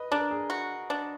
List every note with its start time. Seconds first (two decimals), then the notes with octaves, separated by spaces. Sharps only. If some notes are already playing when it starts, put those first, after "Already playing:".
Already playing: B4 D#5
0.11 D4 A#4
0.31 G#4
0.50 F#4
0.90 D4